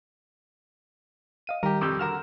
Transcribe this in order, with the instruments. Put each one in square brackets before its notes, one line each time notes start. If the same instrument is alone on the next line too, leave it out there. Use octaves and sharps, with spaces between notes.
[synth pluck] D#5 F5 D#7
[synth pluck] D#3 G3 [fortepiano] G4 A#4
[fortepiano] C2 F2 G3 [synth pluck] D6 E6 G6
[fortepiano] D3 F#4 A#4 [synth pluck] F6 E7